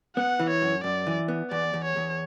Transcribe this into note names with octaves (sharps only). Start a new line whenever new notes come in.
B3 F#5
E3
C#5
F#2
F#2 D5
E3
B3
E2 D5
E2
C#5
E2